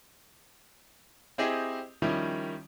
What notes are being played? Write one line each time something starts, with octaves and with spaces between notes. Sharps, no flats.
C4 E4 G4 G#4 D#5
D#3 F3 G3 C#4 E4